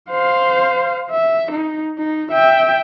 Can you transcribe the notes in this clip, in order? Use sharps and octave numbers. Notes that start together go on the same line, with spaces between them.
C5 F5
E5
D#4
D#4
E5 G5